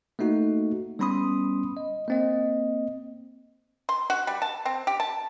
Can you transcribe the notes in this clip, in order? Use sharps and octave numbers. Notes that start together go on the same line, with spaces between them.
A3 A#3 D#4 F#4
G3 B3 C#4 B5 C6 D#6
D#5
A#3 C4 D#5
C6
F#4
G3
A5
C4
G4
A5